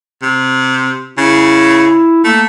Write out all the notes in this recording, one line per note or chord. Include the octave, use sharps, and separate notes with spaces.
C3
C#3 E4
A3 A#3